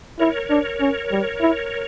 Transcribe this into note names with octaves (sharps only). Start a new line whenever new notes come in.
E4 A#4 C#5
D4
C#4
G3
E4